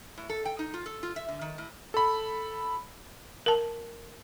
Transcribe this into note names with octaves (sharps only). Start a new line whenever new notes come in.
A2
A4
G5
D#4
F4
A4
F4
E5
D3
D#3
A2
A4 B5
A#4 A5